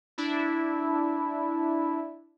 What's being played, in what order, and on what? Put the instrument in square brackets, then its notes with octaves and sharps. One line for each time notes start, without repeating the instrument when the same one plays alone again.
[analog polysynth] D4 E4